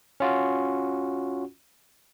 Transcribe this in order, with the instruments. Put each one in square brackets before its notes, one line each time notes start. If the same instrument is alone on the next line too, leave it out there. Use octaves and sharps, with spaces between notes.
[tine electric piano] C#4 F4 F#4